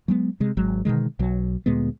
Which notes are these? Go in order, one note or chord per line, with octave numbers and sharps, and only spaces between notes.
F#3 G#3 B3
C3 G#3
G#1 F#3 G#3
B2 D3 D#3 G#3
B1 F#3
D2 A#2 G#3 B3